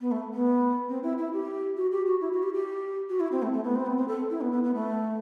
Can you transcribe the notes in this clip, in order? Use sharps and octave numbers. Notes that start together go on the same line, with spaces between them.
B3
A3
B3
C4
E4
E4
G4
F#4
G4
F#4
E4
F#4
G4
G4
F#4
E4
C4
A3
A3
B3
C4
B3
C4
A4
E4
B3
B3
B3
A3